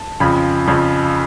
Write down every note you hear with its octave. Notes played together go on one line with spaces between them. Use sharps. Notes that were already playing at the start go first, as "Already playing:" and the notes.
Already playing: A5
F2 C#3 F3 B5
F2 C#3 F3